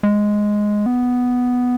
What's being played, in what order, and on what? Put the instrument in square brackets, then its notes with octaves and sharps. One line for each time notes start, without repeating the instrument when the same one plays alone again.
[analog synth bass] G#3
B3